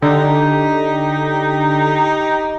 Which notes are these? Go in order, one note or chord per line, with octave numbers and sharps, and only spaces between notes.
D3 D#4 G4